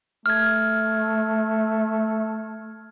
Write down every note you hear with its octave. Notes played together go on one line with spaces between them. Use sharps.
A3 F6 G#6